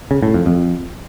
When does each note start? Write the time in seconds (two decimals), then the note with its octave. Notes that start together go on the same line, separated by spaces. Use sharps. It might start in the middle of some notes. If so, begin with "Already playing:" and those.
0.11 C#3
0.23 A2
0.34 F2
0.46 F2